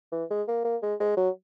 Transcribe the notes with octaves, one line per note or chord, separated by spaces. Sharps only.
E3
G#3
A#3
A#3
G#3
G#3
F#3